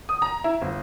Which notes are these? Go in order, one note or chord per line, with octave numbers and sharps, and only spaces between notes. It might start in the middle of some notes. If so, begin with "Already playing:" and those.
D#6
A#5
E4
G1